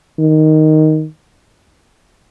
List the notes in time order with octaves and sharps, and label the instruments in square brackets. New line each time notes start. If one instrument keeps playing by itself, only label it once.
[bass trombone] D#3